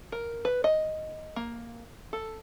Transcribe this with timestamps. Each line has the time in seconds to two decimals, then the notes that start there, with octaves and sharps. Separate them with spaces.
0.12 A#4
0.45 B4
0.64 D#5
1.36 A#3
2.13 A4